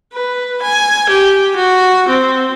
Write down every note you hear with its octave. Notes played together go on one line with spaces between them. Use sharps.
B4
G#5
G4
F#4
C4